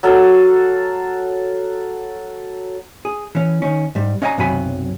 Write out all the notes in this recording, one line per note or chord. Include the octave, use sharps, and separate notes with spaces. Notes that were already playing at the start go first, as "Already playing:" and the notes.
F#3 A4 F5
G#4
E3 C#4
D#3 C#4
G#2 G3
C#4 D#5 F5 G5 G#5 A#5
B1 F#2 C3 F#3 G#5 B5